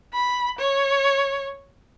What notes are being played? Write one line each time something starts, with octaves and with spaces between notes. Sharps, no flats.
B5
C#5